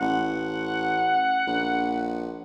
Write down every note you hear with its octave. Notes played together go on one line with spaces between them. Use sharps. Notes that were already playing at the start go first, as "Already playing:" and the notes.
A1 F#5
A#1